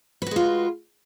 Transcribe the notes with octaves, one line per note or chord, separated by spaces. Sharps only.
G#3 F4 F#4 B4